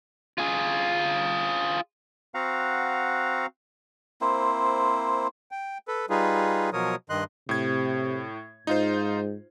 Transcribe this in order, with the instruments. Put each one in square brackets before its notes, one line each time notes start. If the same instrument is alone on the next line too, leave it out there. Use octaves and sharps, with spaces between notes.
[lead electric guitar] F4 G#4
[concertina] C4 F#4 F5 F#5 A#5
[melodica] A#3 C4 E4 C5
[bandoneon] G5
A4 B4
G3 D#4 F4 G#4 B4
B2 F3 F#3 A#4 C#5 D#6
G2 D#3 D#5 C6 F#6
[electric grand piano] A2 G#6 [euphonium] C3
[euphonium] G#2 [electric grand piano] D#4 F4 C5